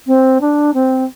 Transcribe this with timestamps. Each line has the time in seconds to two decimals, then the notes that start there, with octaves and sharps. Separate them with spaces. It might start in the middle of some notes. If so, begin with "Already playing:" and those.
0.07 C4
0.41 D4
0.74 C4